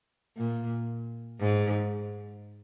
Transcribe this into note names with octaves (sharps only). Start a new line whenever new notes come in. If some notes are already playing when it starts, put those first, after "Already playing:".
A#2
G#2